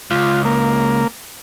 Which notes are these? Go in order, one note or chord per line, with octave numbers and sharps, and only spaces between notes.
C#2 F4
A#3